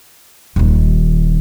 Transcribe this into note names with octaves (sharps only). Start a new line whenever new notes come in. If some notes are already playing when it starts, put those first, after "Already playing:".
D#1 D#3